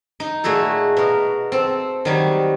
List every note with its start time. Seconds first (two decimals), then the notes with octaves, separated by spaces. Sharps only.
0.20 D#4
0.44 A#2 A3 F#4 G#4 A4
0.97 B2 A#4
1.52 C4 A4
2.05 D#3 F#3 G3